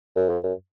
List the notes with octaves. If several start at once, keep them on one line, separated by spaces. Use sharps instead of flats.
F#2
F2
F#2